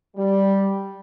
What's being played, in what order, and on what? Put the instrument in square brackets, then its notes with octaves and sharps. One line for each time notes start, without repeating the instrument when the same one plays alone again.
[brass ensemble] G3